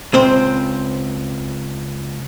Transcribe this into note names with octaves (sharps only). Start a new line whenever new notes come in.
C#2 C4 C5